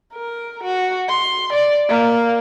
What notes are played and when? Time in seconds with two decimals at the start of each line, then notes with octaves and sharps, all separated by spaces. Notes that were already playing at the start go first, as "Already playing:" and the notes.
0.14 A#4
0.64 F#4
1.09 C6
1.53 D5
1.89 A#3